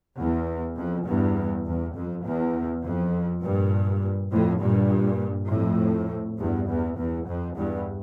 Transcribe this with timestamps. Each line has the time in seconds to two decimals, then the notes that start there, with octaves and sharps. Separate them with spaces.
0.18 E2
0.77 F2
1.07 E2 G2
1.66 E2
1.95 F2
2.25 E2
2.84 F2
3.43 G2 A#2
4.32 F2 A2
4.61 G2 A#2
5.50 F2 A2
6.38 E2 G2
6.68 E2
6.98 E2
7.27 F2
7.57 E2 G2